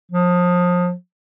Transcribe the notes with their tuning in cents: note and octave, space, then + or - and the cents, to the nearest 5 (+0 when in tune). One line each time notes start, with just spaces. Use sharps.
F3 +30